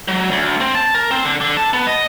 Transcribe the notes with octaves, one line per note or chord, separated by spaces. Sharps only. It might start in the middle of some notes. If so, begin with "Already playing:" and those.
F#3
D2
C4
A5
A#4
C4
D3
D3
A5
B3
D#5